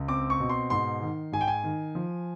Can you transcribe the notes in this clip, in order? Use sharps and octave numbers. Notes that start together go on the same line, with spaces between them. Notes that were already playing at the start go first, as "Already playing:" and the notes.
Already playing: C#2
C4 D6
C#6
B2
C6
G#2 C6
D#3
G#2 G#5
G5
G#5
D#3
F3